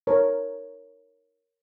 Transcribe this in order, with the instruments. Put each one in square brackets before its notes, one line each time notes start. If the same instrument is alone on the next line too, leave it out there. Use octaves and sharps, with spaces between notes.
[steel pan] A#4 C#5